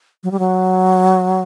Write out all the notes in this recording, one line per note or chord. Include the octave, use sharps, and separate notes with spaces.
F#3
G3
F#3